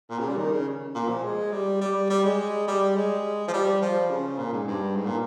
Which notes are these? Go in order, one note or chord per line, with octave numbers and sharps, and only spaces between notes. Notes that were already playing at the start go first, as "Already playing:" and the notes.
A#2
C#3
G3
D#3
C#3
A#2
F3
G#3
G3
G3
G3
G#3
G3
G#3
F3
G3
F3
C#3
A#2
G#2
G2
G#2
A#2